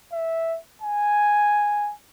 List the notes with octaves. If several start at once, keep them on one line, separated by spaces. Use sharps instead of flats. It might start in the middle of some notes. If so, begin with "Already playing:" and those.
E5
G#5